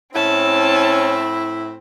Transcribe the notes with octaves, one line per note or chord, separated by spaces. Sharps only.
A2 C4 C#4 E4 A5